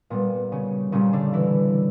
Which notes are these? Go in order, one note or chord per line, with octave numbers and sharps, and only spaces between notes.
A#2 G3 B3
C#3 C#4
A#2 C#3 G3 C#4
D3 D4
E3 E4